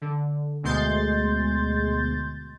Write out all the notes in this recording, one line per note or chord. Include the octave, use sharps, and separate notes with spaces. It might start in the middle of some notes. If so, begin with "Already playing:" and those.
D3
D2 B2 G#3 C6 G6 A6